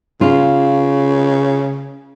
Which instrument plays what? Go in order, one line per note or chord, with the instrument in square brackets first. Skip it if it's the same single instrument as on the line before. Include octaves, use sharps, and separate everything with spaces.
[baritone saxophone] C#3 [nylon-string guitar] F4